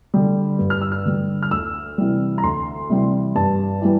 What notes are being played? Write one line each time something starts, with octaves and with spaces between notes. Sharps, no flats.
D3 G3
G2
F6
E6
F6
D3 G3
F6
D2 E6
C3 E3 G3
A#5
D2 C6
C3 E3 G3
G2 A5
E3 G3